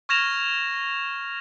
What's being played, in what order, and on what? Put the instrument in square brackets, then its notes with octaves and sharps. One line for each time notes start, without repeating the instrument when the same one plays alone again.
[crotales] C#6 F6 G#6 A#6 E7 F7